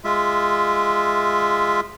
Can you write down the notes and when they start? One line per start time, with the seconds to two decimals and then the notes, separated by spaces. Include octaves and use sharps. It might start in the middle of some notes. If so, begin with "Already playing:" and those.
0.04 G#3 F4 E5